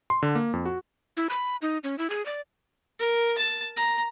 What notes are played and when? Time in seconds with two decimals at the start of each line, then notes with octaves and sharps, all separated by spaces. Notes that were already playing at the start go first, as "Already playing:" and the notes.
0.10 C6
0.23 D3
0.35 A#3
0.53 F2
0.65 F#4
1.17 E4
1.30 B5
1.62 D#4
1.84 C#4
1.99 E4
2.10 G#4
2.26 D5
2.99 A#4
3.38 A5
3.77 A#5